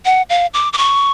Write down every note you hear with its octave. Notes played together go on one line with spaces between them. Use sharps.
F#5
F5
D6
D6
C#6